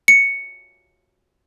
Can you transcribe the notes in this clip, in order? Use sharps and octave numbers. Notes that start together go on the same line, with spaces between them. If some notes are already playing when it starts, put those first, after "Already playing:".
C#7